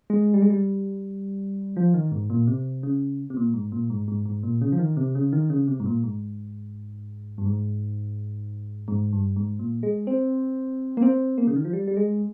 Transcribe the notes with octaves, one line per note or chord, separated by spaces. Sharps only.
G#3
G3
G#3
G3
F3
D#3
G#2
A#2
C3
C#3
C3
A#2
G#2
A#2
G#2
G#2
G#2
A#2
C#3
F3
D#3
C3
C#3
D#3
C#3
C3
G#2
A#2
G#2
G2
G#2
G#2
G2
G#2
A#2
G#3
C4
A#3
C4
A#3
C#3
D#3
F3
G3
G3
G#3